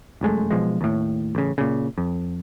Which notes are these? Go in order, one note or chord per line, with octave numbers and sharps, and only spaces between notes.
F1 F#2 G#3 A3
B1 B2 F3 G#3
D#2 A2
A1 C#3
A#2 C#3
F2